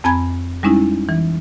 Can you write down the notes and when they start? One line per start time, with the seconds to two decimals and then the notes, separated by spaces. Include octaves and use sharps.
0.04 F2 C4 G#5 A#5 B5 G#6
0.63 G3 G#3 C#4 D#4 E4
1.09 E3